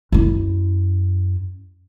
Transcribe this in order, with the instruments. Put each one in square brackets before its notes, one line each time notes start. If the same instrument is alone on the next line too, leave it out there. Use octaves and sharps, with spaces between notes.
[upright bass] F#2 E4